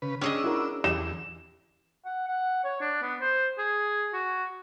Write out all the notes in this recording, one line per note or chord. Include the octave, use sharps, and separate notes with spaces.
C#3 B4
C#4 D4 G#4 D#5 G5 E6
E4 F#4 A#4
E2 G4 E7
F#5
F#5
C#5
D4
B3
C5
G#4
F#4